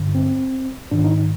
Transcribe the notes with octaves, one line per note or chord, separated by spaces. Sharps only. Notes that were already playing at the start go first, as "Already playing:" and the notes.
Already playing: G2 D3
C4
G#2 D#3 D4
D#4